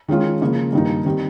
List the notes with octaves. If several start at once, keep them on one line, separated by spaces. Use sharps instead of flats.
D#3 G#3 C#4 F4
C#3 F3 A#3 F4
G2 D#3 A#3 D#4
D#3 G3 C4